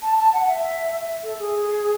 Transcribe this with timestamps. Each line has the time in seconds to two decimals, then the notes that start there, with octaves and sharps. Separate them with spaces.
0.02 A5
0.17 A5
0.33 F#5
0.48 E5
1.23 A4
1.39 G#4